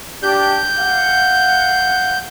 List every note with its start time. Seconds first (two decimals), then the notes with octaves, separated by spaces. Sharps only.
0.23 D4 G4 G6
0.79 F5 F#5